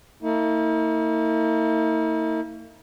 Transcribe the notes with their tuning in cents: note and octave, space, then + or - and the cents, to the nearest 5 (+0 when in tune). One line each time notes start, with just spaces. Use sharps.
A#3 -40 E4 -45